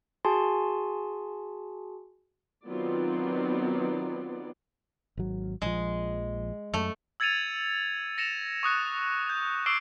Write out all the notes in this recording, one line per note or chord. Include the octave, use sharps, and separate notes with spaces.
F#4 G#4 G#5 A5 C6
D#3 F#3 B3 C4 F4 D5
G#1 F#3
A#1 F3 G#3
F#2 A3
E6 G#6 A6 C#7 D#7 F7
A#6 C#7 E7 F7
C#6 D#6 F#6 C#7
G6
C#6 D6 E6 C7 D7 G7